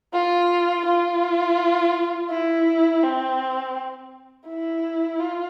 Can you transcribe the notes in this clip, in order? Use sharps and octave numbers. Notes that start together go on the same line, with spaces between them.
F4
F4
E4
C4
E4
F4